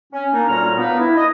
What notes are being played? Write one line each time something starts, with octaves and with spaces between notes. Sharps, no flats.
C#4
A#3 D4 D#4
D2 A#2 G3 C#5 A#5 F6
A#3 B3 D4 D#4 A#4 B4
E4
D#5